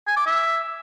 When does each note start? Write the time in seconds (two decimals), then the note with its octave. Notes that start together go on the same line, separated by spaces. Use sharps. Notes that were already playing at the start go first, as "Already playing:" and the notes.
0.07 G#5
0.17 D6
0.26 E5